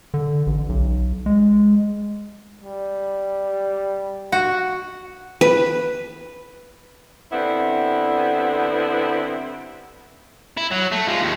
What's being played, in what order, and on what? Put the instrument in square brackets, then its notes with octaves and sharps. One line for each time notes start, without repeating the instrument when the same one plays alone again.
[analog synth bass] D3
A1
B1
G#3
[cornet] G3
[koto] F#4
[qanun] B4
[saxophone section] D3 G3 B3 C4 E4
[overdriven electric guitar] E4
F#3
A3
F3 G#3
D#2